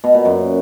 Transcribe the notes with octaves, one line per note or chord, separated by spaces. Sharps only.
B2
A#2
F#2